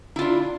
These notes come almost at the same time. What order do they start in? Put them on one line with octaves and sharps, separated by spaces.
E4 F4 D4